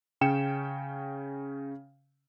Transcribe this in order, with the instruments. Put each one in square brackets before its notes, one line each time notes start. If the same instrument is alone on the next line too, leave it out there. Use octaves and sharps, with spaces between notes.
[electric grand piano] C#3 C#4 G5 C#7 E7